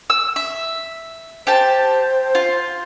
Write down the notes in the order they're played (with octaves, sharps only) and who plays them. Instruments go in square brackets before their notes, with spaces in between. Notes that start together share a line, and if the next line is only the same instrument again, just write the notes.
[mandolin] E6
E5
[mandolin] G4 A5 [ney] C5
[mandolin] F4